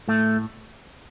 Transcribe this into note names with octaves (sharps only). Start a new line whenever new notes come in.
A2 A3